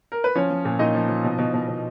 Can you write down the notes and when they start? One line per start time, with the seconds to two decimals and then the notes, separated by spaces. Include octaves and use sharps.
0.12 A#4
0.24 B4
0.35 F3 C#4 C#5
0.50 F3
0.65 A#2
0.79 A#2 D#4 D#5
0.95 F3
1.09 F3
1.24 B2
1.39 B2
1.54 B2
1.68 B2